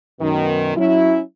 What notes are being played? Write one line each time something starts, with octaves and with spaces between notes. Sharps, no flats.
F#2 B2 D#3
F#3 C#4 E4